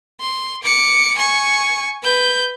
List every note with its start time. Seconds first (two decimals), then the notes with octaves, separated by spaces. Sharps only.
0.21 C6
0.63 D6 C#7
1.17 G#5 C#6
2.03 B4 G6